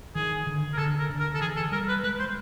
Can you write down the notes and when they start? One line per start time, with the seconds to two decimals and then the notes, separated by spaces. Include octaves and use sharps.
0.15 D#3 G#4
0.47 D3
0.73 A#4
0.78 D3 A4
0.99 A#4
1.10 D3
1.20 A#4
1.35 A4
1.41 E3 G#4
1.56 A4
1.72 G3 A#4
1.89 B4
2.03 G#3 B4
2.19 C5